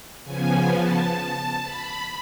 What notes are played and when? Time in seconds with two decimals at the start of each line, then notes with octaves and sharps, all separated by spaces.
0.24 C#3 F3 B3 G#5
0.70 A5
1.16 A5
1.62 B5